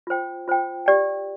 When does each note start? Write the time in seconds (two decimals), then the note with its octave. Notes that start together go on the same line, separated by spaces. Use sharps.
0.07 F4 C5 G5
0.48 F4 C5 G5
0.86 G4 D5 G5